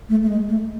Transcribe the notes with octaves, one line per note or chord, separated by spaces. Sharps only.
A3
A3
G#3
A3